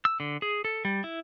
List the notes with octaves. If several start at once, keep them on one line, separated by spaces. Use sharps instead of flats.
E6
D3
G#4
A4
G3
E4